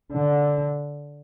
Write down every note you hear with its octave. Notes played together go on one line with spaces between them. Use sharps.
D3